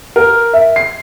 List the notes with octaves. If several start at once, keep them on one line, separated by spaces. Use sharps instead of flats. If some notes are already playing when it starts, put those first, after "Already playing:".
A#4
E5
C7